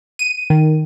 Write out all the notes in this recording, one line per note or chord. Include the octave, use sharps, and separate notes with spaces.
D#7
D#3